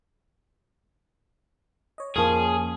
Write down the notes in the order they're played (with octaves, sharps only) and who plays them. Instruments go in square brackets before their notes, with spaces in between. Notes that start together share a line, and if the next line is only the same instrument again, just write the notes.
[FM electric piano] C#5 D#5
[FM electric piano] F2 A#3 [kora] F3 C#4 [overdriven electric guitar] G#4